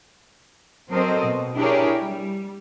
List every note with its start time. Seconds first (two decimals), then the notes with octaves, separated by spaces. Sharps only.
0.92 F#3 C4 A4 A#4 C5 D#5
1.25 B2
1.56 D4 E4 G4 G#4 A#4 C#5
2.02 G3